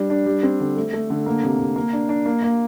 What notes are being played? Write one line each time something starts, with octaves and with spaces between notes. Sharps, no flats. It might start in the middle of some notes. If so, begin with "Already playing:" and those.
Already playing: G3 D4
D4
G3
C4
D3
A3
A3
D3
A#3
C3
C3
A#3
D4
D4
A#3
A#3